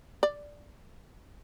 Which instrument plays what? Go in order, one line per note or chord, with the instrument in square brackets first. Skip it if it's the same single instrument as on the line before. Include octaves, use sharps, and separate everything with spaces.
[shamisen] D5